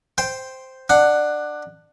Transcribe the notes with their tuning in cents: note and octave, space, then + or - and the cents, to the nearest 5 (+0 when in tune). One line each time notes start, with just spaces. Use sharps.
C5 +0 G5 +0
D4 +20 F#5 +0